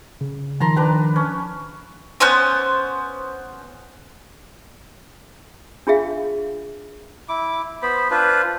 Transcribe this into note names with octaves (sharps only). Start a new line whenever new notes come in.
C#3
D#3 F3 A5 A#5 C6
D4 B4 G5
C#4
B3 C#4 C5 C#5
D4 F4 G#4 E5 F5
E4 D6
B3 C5 B5
D4 F4 B4 C5